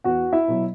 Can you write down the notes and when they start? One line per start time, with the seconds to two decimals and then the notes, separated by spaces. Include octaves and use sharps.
0.04 E2 F#4 F#5
0.33 E4 E5
0.48 B2 F#3